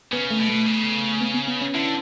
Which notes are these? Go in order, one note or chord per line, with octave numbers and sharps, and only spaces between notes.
C#3 B3
A3
B2
A3
C#3
B3
B3
B3
C#4
D3 E4